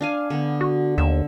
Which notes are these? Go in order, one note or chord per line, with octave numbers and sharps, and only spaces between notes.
D4 F5 G#5
D3 B3
F#4
D#2 E5